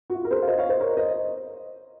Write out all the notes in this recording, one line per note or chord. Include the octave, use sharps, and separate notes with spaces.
F#4
F4
A#4
G#4 C5
F5
C5 D#5
C#5 F5
C5 D#5
A#4 C#5
C5 D#5